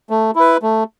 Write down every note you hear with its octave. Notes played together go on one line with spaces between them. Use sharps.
A3
E4 B4
A3